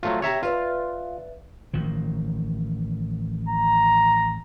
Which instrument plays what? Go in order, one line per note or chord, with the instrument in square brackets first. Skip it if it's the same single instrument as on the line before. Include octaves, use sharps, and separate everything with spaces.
[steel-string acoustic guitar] F3 [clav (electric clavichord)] F#3 A3 F4
[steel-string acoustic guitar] C3 G4 [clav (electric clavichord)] C#5 E5 A#5
[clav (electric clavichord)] F4 [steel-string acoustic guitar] B4 D5 E5
[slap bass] A1 D#3 F3
[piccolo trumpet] A#5